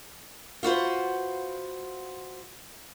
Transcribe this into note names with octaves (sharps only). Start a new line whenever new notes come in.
F4 F#4 B4 C5